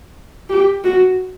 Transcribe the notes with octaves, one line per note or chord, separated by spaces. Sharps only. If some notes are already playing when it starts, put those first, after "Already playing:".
G4
F#4